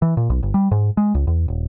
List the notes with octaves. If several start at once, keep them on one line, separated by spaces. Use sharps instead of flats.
E3
A#2
B1
G1
G3
G#2
G#3
C#2
E2
D#1